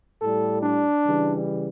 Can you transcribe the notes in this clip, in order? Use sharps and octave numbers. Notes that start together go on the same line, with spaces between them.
A2 G3 A4
D4
C#3 E3 G3